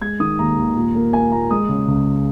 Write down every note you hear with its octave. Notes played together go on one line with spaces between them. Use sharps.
G#3 G#6
D#3 D#6
D#2 A#5
D#2
A#2
A#3
A#3 G#5
A#2 A#5
G#3 D#6
C#3
C#2